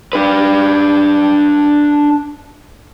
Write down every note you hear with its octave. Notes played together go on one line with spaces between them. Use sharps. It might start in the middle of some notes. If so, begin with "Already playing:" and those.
D4 B4